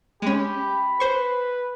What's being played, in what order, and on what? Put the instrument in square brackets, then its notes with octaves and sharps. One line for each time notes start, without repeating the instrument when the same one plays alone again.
[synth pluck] G#3 C#4 [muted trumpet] G4 [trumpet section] B5
[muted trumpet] B4 [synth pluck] C5 C#6